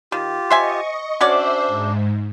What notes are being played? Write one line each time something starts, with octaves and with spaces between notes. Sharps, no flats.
D#3 F4 G4
C5 D#5 E5 G#5 C#6
C#4 D4 F#4 C5 D5 E5
G#2